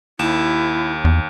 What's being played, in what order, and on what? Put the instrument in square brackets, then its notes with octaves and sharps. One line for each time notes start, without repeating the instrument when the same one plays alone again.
[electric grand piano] D#2 E7 [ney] E4
[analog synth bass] E2